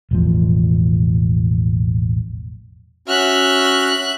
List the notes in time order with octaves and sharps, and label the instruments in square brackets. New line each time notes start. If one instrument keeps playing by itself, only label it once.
[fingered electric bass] E1 A1 F3
[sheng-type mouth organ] C#4 F#4 F6 [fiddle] E5 F#6